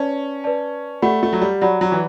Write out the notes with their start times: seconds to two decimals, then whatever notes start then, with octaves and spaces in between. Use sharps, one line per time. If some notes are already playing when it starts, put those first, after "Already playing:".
Already playing: C#4 B4 D5 A5
0.44 B4 D5 A5
1.02 A3 G4 D5 F#5 B5
1.23 A3
1.33 F#3
1.41 G3
1.61 F#3 G4 D5 F#5 B5
1.81 F#3
1.92 E3